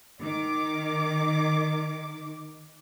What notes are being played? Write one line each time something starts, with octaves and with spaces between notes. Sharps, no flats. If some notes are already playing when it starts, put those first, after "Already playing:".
D#3 D6